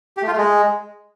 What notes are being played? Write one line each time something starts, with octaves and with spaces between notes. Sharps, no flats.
G4
A3
F4
A3
G#3